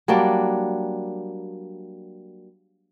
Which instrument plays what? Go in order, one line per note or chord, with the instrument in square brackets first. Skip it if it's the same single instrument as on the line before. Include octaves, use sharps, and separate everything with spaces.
[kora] F#3 G3 A#3 D4